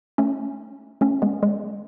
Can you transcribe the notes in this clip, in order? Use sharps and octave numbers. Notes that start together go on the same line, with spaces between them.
A3 C#4
A3 C#4
G#3 B3
G#3